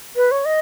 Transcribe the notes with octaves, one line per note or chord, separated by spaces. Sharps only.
B4
C#5
D#5